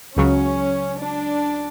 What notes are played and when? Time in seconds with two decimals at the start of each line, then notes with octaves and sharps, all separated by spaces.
0.16 C#2 C#3 F#3 C#4
1.00 D4